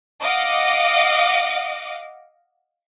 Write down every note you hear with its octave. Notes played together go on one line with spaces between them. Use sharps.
D#5 F5 F#5 D6